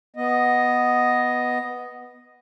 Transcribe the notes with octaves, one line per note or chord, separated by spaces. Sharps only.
B3 D#5